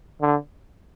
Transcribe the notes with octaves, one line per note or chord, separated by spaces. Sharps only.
D3